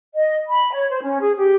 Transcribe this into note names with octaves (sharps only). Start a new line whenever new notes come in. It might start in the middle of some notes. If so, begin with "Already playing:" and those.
D#5
B5
C#5
C5
C#4
G#4
G4